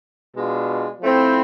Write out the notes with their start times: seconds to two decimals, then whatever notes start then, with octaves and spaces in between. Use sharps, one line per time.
0.34 B2 G#3 D4 F4
1.01 F3 A3 C4 E4